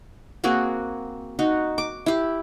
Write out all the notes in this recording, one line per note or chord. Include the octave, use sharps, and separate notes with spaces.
A#3 C4 F#4 G#4
D#4 F#4
D6
E4 G4